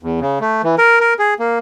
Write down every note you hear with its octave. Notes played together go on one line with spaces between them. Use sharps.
E2
C#3
A3
E3
A#4
A#4
G#4
A#3